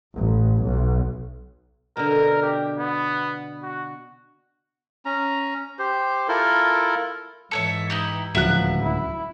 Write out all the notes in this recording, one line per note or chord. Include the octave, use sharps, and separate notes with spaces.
A1
B1
B2 D3 A#4
G4
B3
F#4
C#4 A#5
G4 C5
E4 F4 A4 A#4
G#2 E3 A4 C#5 E5
D#4 E4 G4
D1 C#2 F3 F#3 E5 F#6
E4